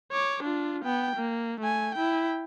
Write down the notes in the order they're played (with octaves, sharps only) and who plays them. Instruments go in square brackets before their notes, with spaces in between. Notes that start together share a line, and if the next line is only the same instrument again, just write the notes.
[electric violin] C#5 D6
D4 F4
B3 G5
A#3
A3 G#5
E4 G5